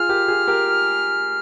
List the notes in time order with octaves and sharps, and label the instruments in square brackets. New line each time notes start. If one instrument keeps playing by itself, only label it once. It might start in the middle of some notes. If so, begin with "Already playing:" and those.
Already playing: [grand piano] F4 G#4 [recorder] F6
[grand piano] G4 A#4
F4 G#4
G4 A#4